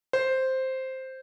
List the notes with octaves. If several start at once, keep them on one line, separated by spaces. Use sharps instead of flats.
C5